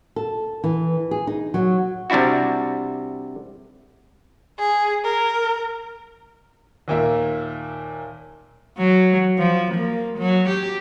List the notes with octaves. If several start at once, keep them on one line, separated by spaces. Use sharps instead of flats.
A4
E3
G#4
D#4
F#3
C3 G3 D4 E4 F#4
G#4
A#4
D#2 A#2 A#3 E5
F#3
F3
A#3
F#3
G4